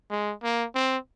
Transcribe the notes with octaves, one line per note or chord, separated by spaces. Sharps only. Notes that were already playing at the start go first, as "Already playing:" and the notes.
G#3
A#3
C4